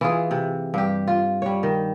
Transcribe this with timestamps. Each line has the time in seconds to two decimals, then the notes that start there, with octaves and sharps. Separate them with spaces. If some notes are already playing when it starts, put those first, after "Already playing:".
0.01 E3 F4 G#4
0.31 C3
0.74 G2 G4
1.07 F4
1.42 G3 C#5
1.63 D#3